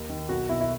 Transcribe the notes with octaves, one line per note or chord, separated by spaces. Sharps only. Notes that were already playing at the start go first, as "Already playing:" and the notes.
Already playing: D#2
D#3
B1 F#4
B2 E4
E4